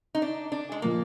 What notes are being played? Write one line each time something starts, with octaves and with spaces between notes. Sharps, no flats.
D#4
D4
D4
G#3
A#2 F3 A#3